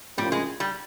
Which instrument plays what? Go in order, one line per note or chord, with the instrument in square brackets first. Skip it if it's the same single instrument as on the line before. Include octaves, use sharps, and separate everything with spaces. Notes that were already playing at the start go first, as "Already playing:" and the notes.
[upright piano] A2 F3 A#3 C#4 F4 [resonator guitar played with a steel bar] G3
[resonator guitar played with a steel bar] G#3
G3